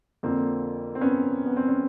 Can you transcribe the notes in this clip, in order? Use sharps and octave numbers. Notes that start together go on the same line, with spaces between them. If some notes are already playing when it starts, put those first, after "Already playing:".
F2 D3 F3 A#3 C4
C4
B3 C#4
B3
C4
C#4